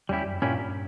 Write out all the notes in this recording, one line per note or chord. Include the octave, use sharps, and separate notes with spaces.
E2 G3 C#4 E4 G4
F#2
G2 A#2 A#3 C#4 E4 G4